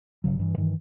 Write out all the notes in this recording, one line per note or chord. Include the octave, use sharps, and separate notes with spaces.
G1 D#2 C#3 F#3
G2 E3
G2 D#3 E3